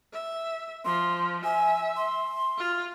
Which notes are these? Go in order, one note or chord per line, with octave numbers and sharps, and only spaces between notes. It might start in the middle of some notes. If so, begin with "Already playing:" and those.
E5
F3 C6
E5 G#5
C6
F4